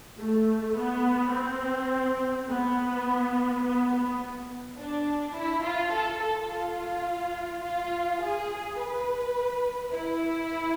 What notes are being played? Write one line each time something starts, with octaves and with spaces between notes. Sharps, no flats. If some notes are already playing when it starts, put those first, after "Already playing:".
A3
B3
C4
B3
B3
B3
D4
E4
F4
A4
A4
F4
F4
G#4
B4
E4